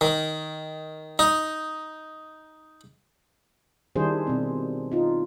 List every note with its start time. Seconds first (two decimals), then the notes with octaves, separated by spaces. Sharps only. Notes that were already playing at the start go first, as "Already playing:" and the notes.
0.01 D#3
1.19 D#4
3.96 D#3 G3 D4 E4 G#4 C5
4.27 B2 C4
4.92 D#4 F4